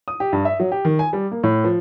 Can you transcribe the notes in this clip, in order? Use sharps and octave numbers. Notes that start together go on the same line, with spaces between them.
D#6
G4
G2
E5
F#3
G4
D#3
G#5
G3
A#3
A2
F3